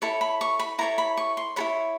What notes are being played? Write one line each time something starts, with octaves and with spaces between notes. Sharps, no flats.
E4 A4 C#5 B5
B5
C#6
B5
E4 A4 C#5 A#5
B5
C#6
C6
E4 A4 C#5 B5